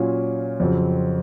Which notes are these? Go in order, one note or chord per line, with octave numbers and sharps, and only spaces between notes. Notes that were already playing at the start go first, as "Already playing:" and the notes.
Already playing: A#2 F#3 C#4 F4
F2 C#3 F#3 C4